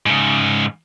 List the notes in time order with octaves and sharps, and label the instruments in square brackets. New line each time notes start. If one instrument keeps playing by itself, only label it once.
[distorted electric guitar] G#2 C#3